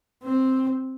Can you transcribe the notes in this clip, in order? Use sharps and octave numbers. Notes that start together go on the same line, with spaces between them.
C4